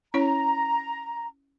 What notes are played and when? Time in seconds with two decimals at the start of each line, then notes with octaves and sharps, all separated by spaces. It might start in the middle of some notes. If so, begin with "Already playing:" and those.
0.14 C#4 E4 C#5 A#5